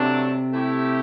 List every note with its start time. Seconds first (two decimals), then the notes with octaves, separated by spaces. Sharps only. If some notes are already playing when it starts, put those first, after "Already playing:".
Already playing: G2 C3 F#3 A3 D4
0.51 A3 E4 G4